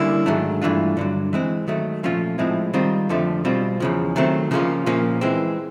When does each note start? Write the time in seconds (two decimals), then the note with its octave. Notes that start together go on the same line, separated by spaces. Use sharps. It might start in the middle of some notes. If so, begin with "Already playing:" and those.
Already playing: D3 G3 A#3 C#4 E4
0.26 G#2 D#3 F#3 A3 D4
0.62 G2 E3 A3 D4 F4
0.97 G2 D3 F#3
1.33 E3 G#3 C4
1.68 D#3 F#3 A3
2.03 A#2 F3 A3 C#4 F4
2.38 A2 F3 G#3 C4 E4
2.74 D#3 G3 C4 F4
3.09 F2 D3 F3 A3
3.45 B2 G3 C4 F4
3.80 E2 C#3 F3
4.16 D#3 F#3 A3 C4
4.51 C#3 F3 A#3 C#4 F4
4.86 A#2 F3 A#3 C#4
5.21 E3 G#3 C4